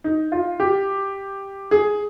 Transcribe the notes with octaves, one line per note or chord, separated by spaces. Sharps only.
D#4
F4
G4
G#4